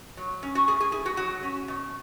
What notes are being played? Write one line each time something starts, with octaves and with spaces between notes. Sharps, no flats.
F#3
C#4
F#4
A2 G#4
G#4
E4 G#4
F#4
F#3 F#4
C#4
B2